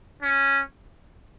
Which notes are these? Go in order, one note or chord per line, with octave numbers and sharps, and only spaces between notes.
C#4